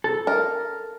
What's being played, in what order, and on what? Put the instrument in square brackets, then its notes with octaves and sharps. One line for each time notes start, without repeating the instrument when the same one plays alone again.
[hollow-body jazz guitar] A4
[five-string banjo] A#4